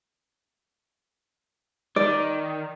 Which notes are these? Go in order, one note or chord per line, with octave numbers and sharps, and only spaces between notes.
D#3 D5